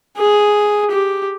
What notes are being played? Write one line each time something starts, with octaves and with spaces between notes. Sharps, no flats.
G#4
G4